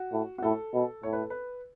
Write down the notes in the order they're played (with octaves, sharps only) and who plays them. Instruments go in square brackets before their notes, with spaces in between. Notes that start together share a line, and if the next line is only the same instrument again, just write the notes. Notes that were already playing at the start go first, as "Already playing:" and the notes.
Already playing: [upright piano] F#4
[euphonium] A2
[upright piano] F#4
[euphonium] A2 [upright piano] A4
[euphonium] B2
[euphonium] A2 [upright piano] C#5
[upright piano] B4
A4
B4